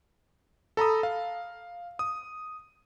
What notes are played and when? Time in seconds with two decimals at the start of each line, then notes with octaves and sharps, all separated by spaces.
0.77 A4 A#5 B5 D#6
1.03 F5
1.99 D#6